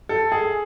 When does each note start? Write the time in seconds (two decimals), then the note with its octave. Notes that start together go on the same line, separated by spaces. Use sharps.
0.09 A4
0.32 G#4